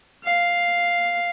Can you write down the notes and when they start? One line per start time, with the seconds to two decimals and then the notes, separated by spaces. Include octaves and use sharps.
0.24 F5